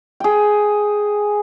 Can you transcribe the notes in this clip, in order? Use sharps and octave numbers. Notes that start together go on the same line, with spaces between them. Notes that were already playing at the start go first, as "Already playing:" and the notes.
G#4 G5